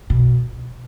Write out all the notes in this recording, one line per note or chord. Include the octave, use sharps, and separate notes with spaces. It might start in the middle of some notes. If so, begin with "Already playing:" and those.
B2